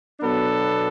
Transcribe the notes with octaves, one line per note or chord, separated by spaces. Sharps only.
B2 F#3 B3 D4 A4